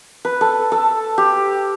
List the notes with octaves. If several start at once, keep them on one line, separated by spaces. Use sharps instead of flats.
B4
A4
A4
G4